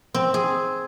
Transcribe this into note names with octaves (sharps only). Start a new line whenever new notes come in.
C4
G#4